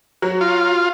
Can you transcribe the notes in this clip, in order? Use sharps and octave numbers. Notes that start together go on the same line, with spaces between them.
F#3
F4